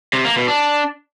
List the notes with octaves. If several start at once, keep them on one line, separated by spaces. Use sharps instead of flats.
C3
A#3
B2
D4